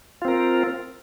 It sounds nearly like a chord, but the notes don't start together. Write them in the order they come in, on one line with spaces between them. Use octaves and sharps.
F4 C4 A#4